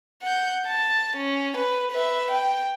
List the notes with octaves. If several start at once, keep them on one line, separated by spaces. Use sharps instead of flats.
F#5 G6
A5
C#4
B4
B4 E5
G5